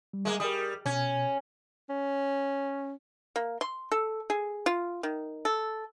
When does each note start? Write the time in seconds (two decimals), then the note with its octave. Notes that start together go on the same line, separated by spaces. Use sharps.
0.13 G3
0.25 G#3 A#3
0.40 G3 A#4 D#6
0.86 B2 C#4 G#6
1.90 C#4
3.36 A#3
3.61 C6
3.92 A4
4.30 G#4
4.66 F4
5.03 D#3
5.45 A4